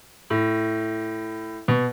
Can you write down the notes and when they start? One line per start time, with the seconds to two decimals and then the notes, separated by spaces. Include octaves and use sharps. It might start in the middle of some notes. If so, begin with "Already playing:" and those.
0.30 A2
1.68 B2